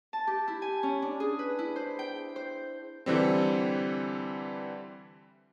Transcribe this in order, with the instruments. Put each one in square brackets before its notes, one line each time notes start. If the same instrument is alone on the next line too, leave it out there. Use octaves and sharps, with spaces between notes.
[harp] A5
G4
E4
G#5
C#4
D4
G#4
B4
E4
C5
G5
C5
[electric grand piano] D3 E3 G3 C4